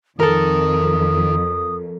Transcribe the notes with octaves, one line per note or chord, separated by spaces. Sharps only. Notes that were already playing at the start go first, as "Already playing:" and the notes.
F2 D#3 A4 A#4 D#6